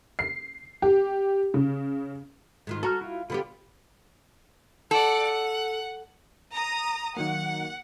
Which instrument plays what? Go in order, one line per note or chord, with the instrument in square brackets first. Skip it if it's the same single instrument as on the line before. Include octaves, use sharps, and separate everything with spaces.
[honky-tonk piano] C7
G4
C#3
[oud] G#2 D#3 F4
[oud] F#4 [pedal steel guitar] A4 A#5 F6
[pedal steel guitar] E4 F4
[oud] D3 B3 G4 [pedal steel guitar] F4 B5
[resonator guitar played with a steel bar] A4 [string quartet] D5 F#5
[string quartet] F#5
[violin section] A#5 D#6
[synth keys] D#3 F#3 A#3 [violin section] F#5